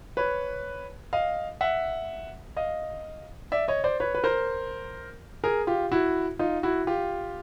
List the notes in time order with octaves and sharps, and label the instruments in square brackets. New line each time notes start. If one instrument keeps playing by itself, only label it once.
[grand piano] B4 C#5
D#5 F5
E5 F#5
D#5 F5
D5 E5
C#5 D#5
C5 D5
B4 C#5
B4
A#4 C5
G#4 A#4
F4 G4
E4 F#4
D#4 F4
E4 F#4
F4 G4